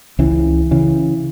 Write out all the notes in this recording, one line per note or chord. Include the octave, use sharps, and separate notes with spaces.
C#2 C#3 E3
C#3 E3